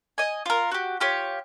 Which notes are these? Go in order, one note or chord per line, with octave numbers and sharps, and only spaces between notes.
D#5 G#5
F4 A#4
F#4 G4
F4 G4 C#5